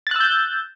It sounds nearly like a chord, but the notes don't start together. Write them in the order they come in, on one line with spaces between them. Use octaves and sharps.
A6 F#6 E6 G6